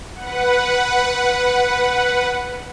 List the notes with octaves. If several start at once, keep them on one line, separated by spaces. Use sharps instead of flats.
B4 F#5